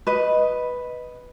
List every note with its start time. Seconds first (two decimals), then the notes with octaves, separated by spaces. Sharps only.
0.07 B4 D#5